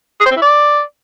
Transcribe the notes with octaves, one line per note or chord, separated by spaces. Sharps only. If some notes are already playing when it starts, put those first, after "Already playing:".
G#4
C5
C4
E4
D5